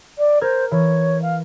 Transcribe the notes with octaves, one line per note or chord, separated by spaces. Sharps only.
D5
A#4 C5 F6 G#6
E3 C#5
F5